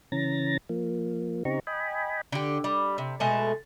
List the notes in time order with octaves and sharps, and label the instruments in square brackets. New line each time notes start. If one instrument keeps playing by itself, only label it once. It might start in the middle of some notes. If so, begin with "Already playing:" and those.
[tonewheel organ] C#3 E3 C#4 A#5 A6 A#6
F3 A#3
C#3 C4 D#4 G4 A#5 C#6
D#5 G5 G#5 B5
[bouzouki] D3 G4
G3
C3
B2 G#3 A3 A5